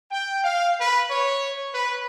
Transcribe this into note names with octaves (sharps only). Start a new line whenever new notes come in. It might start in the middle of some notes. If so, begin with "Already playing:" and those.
G5
F5
B4
C#5
B4